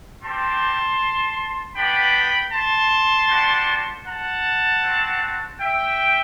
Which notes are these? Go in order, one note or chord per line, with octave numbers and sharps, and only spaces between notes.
G3 C4 G4 A5 C6
B3 D4 G4 G5 B5
A5 C6
G3 D4 F#4
F#5 A5
C4 F#4
E5 G5